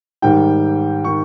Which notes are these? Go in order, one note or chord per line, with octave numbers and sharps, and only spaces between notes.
G#2 D#3 G3 G5
D#3 C#6